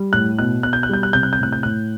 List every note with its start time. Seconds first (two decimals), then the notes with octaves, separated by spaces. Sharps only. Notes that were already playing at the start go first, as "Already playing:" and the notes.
Already playing: G3
0.13 A2 F#6
0.39 B2 F#6
0.63 B2 F#6
0.73 G6
0.83 F#6
0.89 G3 G6
1.03 F#6
1.13 C3 G6
1.23 F#6
1.33 G6
1.39 A2 F#6
1.52 G6
1.63 A2 F#6